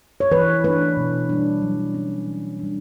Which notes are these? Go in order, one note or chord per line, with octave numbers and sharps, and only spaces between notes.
C#5
E3 B4
A3 D4 B4
B2
G3 D4
F#3
C#4
E3
G3 D4